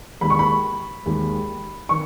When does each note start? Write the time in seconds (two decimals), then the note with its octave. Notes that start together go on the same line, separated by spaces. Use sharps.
0.21 D#2 D#3 G#3 B5
0.30 C#6
0.39 B5
1.06 D#2 D#3 G#3
1.89 D#3 C#6